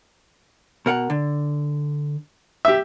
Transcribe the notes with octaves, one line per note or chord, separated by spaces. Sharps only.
B2 A#4 F#5
D3
G4 E5